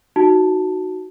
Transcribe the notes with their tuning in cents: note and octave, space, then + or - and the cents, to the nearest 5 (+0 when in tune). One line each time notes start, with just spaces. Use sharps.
D#4 +0 F#4 +0 A5 +0